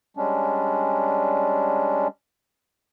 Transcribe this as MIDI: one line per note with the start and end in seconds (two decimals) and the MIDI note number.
0.17 2.08 55
0.17 2.08 56
0.17 2.08 61
0.17 2.08 62